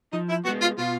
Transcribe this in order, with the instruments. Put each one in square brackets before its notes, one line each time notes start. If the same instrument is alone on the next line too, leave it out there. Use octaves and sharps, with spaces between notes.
[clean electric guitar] F3 [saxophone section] D#4
[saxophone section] E4
[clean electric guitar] B3 [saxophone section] F#4
[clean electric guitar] G#3
[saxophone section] F4
[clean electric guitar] B2 [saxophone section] F4